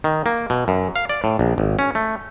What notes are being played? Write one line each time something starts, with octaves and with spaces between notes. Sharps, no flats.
D#3
A#3
B2
F#2
F5
D5
A2
A#1
G#1
C#4
A3